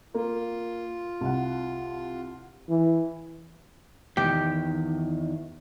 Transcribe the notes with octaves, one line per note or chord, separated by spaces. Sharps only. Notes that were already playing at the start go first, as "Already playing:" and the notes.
A#3 F4
C2 F#5
E3
E2 D#3 G4